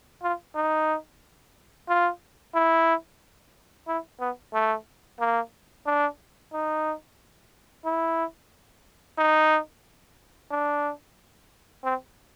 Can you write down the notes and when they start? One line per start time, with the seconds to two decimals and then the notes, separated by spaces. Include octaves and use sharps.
0.23 F4
0.55 D#4
1.89 F4
2.55 E4
3.88 E4
4.20 B3
4.54 A3
5.20 A#3
5.86 D4
6.53 D#4
7.85 E4
9.18 D#4
10.51 D4
11.84 C4